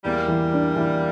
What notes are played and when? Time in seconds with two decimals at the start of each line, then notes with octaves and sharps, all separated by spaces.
0.05 E2 G3 A#3
0.28 E3
0.53 D4
0.76 E3